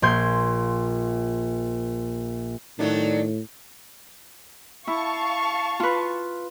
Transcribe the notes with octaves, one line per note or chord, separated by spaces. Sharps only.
A#1 A#2 C6 G6 G#6
A2 D#3 F#3 A3 D4
E4 F5 A5 C#6
F4 B4